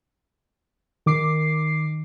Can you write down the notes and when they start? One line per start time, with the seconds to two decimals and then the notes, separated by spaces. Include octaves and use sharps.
1.06 D#3 D6 C7